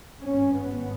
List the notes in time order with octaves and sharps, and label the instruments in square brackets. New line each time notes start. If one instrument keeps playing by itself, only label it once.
[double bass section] G#1 G2 C#4
B3